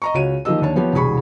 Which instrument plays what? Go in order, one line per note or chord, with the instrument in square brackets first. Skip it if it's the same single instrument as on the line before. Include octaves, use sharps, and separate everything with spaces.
[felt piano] D#5 A#5 C#6
C#2 F#4 C#5 D#7
D#3 F3 A#3 G4 D#5 E6
D#2 D4 C#5 A5
F3 B3 G4 C#5
E1 C2 G#4 B5 C#6